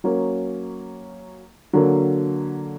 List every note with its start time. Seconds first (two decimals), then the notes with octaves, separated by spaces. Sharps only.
0.04 F#3 A#3 C#4
1.73 D3 F#3 A#3